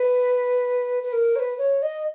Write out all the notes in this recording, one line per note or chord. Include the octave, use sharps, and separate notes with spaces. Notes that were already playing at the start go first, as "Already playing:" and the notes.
Already playing: B4
B4
A#4
C#5
B4
C#5
D#5